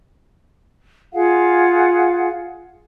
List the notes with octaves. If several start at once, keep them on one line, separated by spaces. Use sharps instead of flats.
F4 G#4 F5 F#5